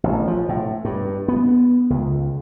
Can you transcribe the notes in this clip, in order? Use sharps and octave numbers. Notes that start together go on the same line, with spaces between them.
A1
F3
A2
G2
B3
C#2